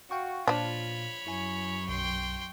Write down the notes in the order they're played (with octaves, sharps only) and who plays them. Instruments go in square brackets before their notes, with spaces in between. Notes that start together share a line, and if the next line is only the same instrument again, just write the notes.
[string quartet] F#4 [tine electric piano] F5 G5 C#6
[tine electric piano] A#2 [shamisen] F3 D4 [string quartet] F4 [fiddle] C#5 B5
[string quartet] F#2 C#6 [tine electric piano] E4 G#5
[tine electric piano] B1 [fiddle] G5 C6